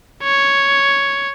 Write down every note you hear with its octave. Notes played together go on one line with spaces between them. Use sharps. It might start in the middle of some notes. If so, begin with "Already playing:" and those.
C#5